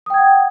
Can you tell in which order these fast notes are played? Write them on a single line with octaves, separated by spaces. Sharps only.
D#6 G5 G#6 F#5